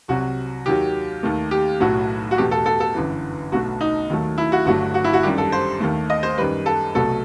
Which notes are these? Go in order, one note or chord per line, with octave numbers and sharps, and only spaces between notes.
C2 C3 F#3 F#4
D#2 D#3 F#3 G4
D#2 D#3 A3
G4
B1 A2 F#3 A3 F#4
F#4
E2 B2 A3 G4
A4
A4
A4
G1 F#2 E3
B1 B2 A3 F#4
D#4
D#2 D#3 F#3 A3
E4
F#4
G1 G2 F#3 A3 F#4
F#4
E4
F#4
F#2 D#3 G3 G4
A4
C5
D#2 D#3 A3
D#5
C5
F#2 D#3 G3 B4
A4
C2 B2 F#3 A3 A4